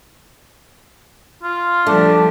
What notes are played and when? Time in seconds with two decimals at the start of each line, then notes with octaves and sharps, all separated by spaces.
1.43 F4
1.87 F3 G3 A3 D4